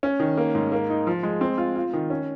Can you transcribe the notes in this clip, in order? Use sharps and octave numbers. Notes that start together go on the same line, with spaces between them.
C#4
D#3
A#3
G#2
A#3
D#4
F3
G#3
C4
F4
F4
D#3
C#4